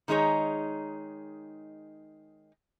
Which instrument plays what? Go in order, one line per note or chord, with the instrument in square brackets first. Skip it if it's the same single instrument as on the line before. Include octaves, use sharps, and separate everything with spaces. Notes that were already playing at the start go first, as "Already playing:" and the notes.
[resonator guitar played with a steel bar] D#3 G#3 D#4 G#4 C#5